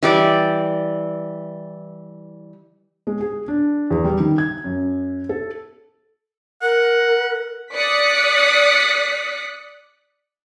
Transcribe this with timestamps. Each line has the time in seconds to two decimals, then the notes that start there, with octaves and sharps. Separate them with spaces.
0.03 E3 G3 D5
3.07 G#3
3.21 G#4
3.48 D4
3.90 E2
4.04 G3
4.20 D#3
4.38 G#6
4.64 F#2
5.29 A4
6.62 A#4 F#5
7.75 D5 D#6 F#6 B6 C#7